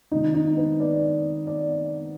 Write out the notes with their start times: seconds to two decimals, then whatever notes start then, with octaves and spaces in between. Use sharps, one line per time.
0.11 C3 D#3 G#3 D#4
0.34 D#4
0.57 B4
0.80 D5
1.47 D5